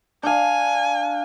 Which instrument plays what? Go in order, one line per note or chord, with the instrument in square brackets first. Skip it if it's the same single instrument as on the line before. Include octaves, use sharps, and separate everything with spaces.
[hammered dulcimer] D4 F5 [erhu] G#5